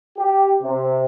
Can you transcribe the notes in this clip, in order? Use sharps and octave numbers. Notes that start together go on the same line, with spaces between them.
G4
C3